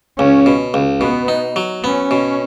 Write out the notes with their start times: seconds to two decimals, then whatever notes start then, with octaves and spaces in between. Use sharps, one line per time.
0.19 C#2 C#4
0.46 B2
0.74 C#2
1.01 B2 B3
1.28 D#4
1.56 F#3
1.83 B3 C#4
2.11 B2